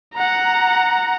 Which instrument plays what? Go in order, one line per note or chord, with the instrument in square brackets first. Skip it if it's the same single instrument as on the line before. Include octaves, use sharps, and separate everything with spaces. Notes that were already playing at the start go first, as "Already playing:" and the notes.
[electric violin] F#5 A#5